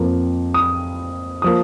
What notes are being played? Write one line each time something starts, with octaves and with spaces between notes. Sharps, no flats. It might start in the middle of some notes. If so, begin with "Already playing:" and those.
Already playing: F2 F3 A#3
D#6
F3 A#3 D#6